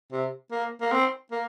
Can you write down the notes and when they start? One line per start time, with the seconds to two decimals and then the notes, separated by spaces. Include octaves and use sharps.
0.12 C3
0.52 A#3
0.81 A#3
0.92 C4
1.32 A#3